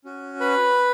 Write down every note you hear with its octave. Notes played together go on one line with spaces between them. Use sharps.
C#4 F#4
B4 B5